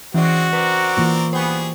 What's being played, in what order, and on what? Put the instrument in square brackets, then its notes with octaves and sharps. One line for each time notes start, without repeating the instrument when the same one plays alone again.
[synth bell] E3 D5 [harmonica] G#3 C4 [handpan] C#4 [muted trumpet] F#4
[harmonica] C4 A#4 D5 [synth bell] B4
[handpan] E3 A#3 F4 [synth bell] C#6
[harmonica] G3 G#4 [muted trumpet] B3 [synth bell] C5 G5 C#6